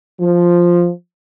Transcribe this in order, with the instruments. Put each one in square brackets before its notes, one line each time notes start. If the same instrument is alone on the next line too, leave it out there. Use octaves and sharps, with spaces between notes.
[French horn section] F3